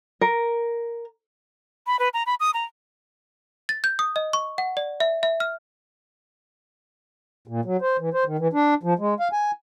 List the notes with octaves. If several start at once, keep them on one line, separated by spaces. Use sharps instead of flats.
A#4
B5
B4
A#5
B5
D#6
A#5
A6
G6
D#6
D#5
C#6
F#5
D5
E5
E5
F6
A#2
F#3
C5
E3
C5
D#3
E3
D4
F3
G#3
F5
G#5